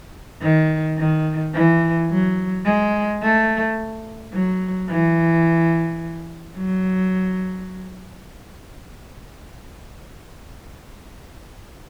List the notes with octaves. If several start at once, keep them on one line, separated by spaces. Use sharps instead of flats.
D#3
D#3
E3
F#3
G#3
A3
F#3
E3
F#3